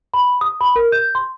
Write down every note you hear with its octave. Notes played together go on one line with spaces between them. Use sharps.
B5
D#6
B5
A#4
G6
C6